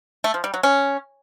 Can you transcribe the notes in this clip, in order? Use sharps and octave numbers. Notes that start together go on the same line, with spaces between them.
A3
F3
G3
F#3
C#4